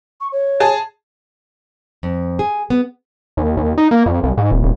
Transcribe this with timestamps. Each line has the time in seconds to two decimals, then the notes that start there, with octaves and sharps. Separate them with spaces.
0.21 C#6
0.32 C#5
0.60 G#4 A5
2.03 F2
2.39 G#4
2.70 B3
3.37 D#2
3.57 D#2
3.78 D#4
3.91 A#3
4.06 F2
4.23 C2
4.37 G#2
4.51 D#1
4.63 D#1